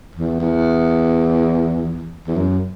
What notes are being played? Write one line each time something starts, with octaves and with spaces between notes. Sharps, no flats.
E2
E2
E2
F#2